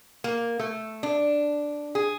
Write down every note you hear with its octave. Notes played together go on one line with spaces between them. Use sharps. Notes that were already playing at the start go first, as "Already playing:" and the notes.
A#3
A3
D4
G#4